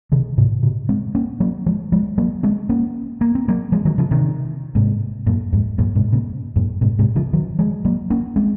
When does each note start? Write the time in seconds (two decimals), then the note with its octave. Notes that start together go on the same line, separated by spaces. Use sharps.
0.12 C3 D#3
0.37 G#2 C3
0.63 A#2 C#3
0.89 G#3 C4
1.15 A#3 C#4
1.40 F#3 A#3
1.66 F3 G#3
1.92 F3 G#3
2.18 F#3 A#3
2.43 G#3 C4
2.69 A#3 C#4
3.21 A#3
3.35 C4
3.48 F#3 A#3
3.72 F3 G#3
3.85 D#3 F#3
3.98 C#3 F3
4.11 C3 D#3
4.75 G#2 C3
5.27 F#2 A#2
5.53 F2 G#2
5.78 F#2 A#2
5.96 G#2 C3
6.13 A#2 C#3
6.56 F#2 A#2
6.81 G#2 C3
6.99 G#2 C3
7.16 C#3 F3
7.33 D#3 F#3
7.59 F3 G#3
7.85 F#3 A#3
8.10 A#3 C#4
8.36 G#3 C4